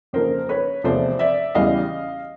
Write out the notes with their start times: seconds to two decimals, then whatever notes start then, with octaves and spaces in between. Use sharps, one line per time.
0.13 F2 C#3 F3 A#3 A#4 C5
0.49 B4 C#5
0.84 E2 C3 F3 A3 C5 D5
1.19 D5 E5
1.55 E2 C#3 E3 G3 D#5 F5